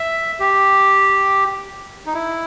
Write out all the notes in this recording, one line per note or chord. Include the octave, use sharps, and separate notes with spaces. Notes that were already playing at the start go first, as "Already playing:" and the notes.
Already playing: E5
G4
D#4
E4